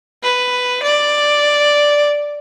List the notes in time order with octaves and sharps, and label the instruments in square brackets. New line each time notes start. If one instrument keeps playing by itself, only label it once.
[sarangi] B4
D5